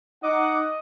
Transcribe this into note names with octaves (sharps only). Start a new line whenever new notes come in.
D#4 D#5 F#5 D6